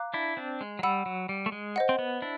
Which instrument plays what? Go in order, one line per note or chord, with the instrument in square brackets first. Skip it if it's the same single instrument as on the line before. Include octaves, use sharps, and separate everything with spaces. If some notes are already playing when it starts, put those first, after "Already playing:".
Already playing: [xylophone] F5 A#5 D6 F#6
[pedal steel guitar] D4 E4
C4 D4
G#3
F#3
[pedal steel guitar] G3 [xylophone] F#5 B5 E6
[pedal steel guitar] F#3
G3
A3
G#3
[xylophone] C5 D#5 F#5
[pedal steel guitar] C4
B3
D4 E4